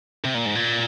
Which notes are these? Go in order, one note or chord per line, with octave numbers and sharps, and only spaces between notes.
C3
A#2
G#2
A#2